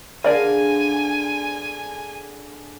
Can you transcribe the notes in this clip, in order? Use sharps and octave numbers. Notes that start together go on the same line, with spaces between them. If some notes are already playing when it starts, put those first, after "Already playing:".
D3 G#4 A#4 D5 F5 G#5 D#7